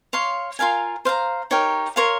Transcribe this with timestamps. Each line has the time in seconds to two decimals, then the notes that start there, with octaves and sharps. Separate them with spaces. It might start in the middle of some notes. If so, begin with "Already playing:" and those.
0.13 C#5 F5 C6
0.59 F4 A#4 F5 G#5
1.05 C5 F5 A#5
1.51 D#4 G4 A#4 C#5
1.96 A#4 C#5 F5 C6